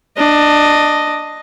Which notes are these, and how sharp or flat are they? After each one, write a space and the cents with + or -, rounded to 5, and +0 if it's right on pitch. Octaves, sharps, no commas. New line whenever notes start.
D4 +15 D#5 +0